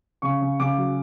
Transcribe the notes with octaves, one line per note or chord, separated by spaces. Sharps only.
C#3 C#6
C#3
C#3 D6
F#3